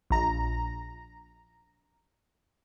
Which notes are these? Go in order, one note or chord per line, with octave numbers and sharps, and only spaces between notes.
A#1 A#5